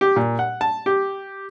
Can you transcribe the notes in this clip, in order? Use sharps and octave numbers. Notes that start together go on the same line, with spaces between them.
G4
A#2
F#5
A5
G4